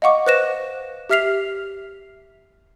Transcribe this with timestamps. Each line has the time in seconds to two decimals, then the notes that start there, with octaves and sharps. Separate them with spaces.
0.02 D#5 F5 F#5 C#6 D6
0.27 B4 C5 F#6 A#6 E7
1.10 G4 E5 F6 B6 C7 F7